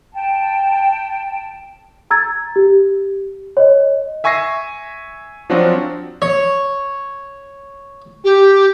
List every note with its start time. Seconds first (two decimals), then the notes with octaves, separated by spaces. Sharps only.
0.13 G5 A5
2.11 A#5 E6 G#6 A6
2.56 G4
3.57 C#5 D#5
4.24 E5 G#5 C#6 E6 A#6 C7
5.50 F3 F#3 C4 D4 F4 F#4
6.22 C#5
8.24 G4